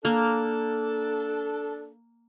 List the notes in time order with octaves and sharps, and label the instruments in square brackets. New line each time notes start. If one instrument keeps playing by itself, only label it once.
[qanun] A#3 [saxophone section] D4 A4